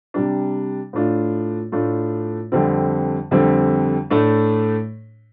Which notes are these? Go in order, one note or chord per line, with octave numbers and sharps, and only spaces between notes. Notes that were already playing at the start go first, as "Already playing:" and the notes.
C3 G3 D4
A2 A3 D4 F4
A2 A3 D4 F4
F2 D3 G3 C4
F2 D3 G3 C4
A2 A3 D4